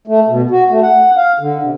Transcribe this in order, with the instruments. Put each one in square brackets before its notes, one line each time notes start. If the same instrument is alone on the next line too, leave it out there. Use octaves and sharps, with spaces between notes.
[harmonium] A3
B2
F#4
A3
F#5
F5
D3
C3